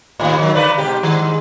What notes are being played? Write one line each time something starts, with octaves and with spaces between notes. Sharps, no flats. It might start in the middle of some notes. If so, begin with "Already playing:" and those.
D#2 A2
D#3 F#3
D3 B4 D5
G#2 B2 G4
G#2 D#3